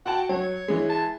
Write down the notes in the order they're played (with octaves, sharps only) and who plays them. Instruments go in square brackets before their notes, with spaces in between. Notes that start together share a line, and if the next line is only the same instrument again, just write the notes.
[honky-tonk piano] F#4 G5 A5 [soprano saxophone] F#5
[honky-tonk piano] F#3 [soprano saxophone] C#5
[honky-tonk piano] E3 G#3
[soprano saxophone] A5